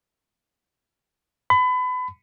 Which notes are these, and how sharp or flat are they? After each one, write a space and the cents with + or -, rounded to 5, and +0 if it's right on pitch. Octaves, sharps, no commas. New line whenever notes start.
B5 +30